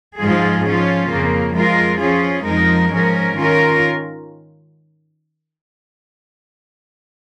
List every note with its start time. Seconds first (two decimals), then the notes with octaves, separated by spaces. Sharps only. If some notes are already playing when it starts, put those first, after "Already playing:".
0.19 G#2 F3 G#3 F4 G#4
0.64 F3 C#4 F4
1.10 F2 C#3 A#3
1.55 F3 G#3 F4 A#4
2.01 F3 C#4 F4 G#4
2.46 F2 F3 G#3 D#4 A#4
2.92 G#2 F3 C#4 A#4
3.38 D#3 C#4 F4 A#4